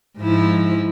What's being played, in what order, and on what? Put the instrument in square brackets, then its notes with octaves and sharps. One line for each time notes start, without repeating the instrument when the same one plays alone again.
[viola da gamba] G#2 F3 E4